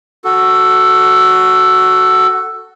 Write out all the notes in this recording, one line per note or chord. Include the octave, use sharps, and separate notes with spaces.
F#4 A4